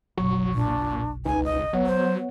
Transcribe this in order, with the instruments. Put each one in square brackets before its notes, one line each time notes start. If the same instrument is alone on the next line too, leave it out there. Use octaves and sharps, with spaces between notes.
[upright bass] F#1 B1 [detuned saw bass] F#3 [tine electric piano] C#6
[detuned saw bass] A#2 [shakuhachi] D4
[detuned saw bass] C#2 [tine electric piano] D#4 B4 [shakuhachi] G#5
[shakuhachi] D#5
[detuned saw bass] F#3 [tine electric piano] B3 C#5 F#5
[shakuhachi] C5